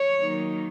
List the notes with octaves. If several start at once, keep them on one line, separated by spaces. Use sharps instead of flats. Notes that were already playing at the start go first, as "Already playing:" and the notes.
Already playing: C#5
D#3 F#3 A#3 D#4